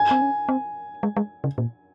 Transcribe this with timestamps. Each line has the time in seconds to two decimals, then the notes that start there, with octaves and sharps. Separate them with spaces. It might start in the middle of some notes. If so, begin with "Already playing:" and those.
Already playing: G#5
0.11 C4
0.22 C#4
0.49 C4
1.03 G#3
1.17 G#3
1.44 C#3
1.58 A#2